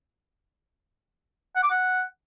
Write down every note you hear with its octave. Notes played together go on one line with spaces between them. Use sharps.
F#5
D6
F#5